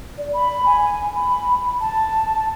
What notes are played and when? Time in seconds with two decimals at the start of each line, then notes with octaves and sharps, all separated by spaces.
0.18 D5
0.33 B5
0.66 G#5
1.16 B5
1.81 A5